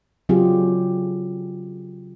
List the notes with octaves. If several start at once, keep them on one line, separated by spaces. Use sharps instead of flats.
C#3 F#3 C4 F4 G4 G#4